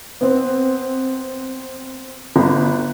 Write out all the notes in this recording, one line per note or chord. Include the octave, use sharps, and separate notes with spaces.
B3 C4
G1 B5